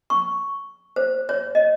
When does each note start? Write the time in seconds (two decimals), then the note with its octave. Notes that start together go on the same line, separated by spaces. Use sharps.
0.10 C#6
0.96 C5
1.29 C#5
1.55 D#5